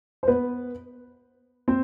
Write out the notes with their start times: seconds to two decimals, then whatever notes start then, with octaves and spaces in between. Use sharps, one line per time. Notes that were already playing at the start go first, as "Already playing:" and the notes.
0.23 C5
0.27 B3 B4
1.68 C4 C5